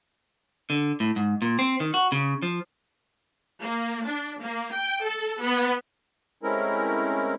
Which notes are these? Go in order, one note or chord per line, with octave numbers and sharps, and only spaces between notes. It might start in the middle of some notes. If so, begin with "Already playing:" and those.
D3
A2
G#2
A#2
C4
D#3
F#4
C#3
F3
A#3
D4
A#3
G5
A4
B3
G#3 A3 C4 C#4 E4 A#4